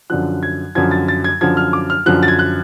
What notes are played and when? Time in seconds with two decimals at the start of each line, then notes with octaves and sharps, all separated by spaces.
0.10 F#2 D3 F3 F#6
0.43 G#6
0.75 F#2 D3 F3 G#6
0.91 A6
1.08 A6
1.24 G#6
1.41 F#2 D3 F3 G#6
1.57 F6
1.73 D6
1.90 F6
2.06 F#2 D3 F3 F#6
2.23 A6
2.28 G#6
2.39 F#6